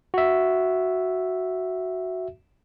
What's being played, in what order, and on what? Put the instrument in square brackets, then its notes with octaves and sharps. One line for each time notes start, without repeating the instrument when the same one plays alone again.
[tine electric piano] F#4 E5